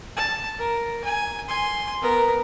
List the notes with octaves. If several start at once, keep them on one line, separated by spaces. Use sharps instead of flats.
A5
A#4
G#5
G#5 C6
B3 A#4